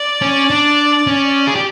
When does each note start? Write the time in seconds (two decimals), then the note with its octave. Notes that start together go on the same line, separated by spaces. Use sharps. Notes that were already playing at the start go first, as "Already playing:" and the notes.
Already playing: D5
0.22 C#4
0.50 D4
1.07 C#4
1.47 G#4
1.56 G4